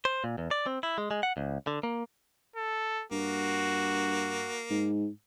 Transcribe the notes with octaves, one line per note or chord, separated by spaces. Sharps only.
C5
A#2
E2
D5
C4
E4
G#3
G#3
F#5
C#2
D3
A#3
A4
G2 A#3 F#4
G#2